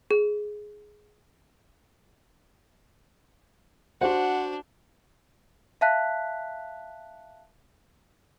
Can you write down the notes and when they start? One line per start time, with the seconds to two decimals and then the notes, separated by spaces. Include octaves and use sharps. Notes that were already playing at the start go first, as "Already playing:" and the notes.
0.11 G#4
4.01 D4 F#4 C5 F#5
5.81 E5 F5 A5 F#6 B6